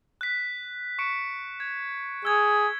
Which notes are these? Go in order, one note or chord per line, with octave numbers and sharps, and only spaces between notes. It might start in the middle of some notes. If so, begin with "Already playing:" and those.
F#6 B6
C#6 C#7 D7
G#6
G#4 E6 G#6